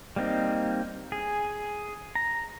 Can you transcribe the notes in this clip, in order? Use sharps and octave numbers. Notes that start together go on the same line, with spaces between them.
G3 A#3 C4 D#4
G#4
A#5